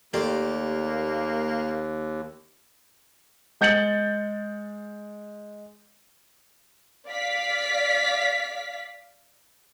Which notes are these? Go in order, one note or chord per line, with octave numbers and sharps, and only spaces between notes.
D#2 A3 A#3 F4 G4 D5
G#3 G6 A6 C#7 F#7
D5 F5 B6